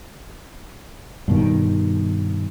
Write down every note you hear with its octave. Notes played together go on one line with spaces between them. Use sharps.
G2 B2 D#3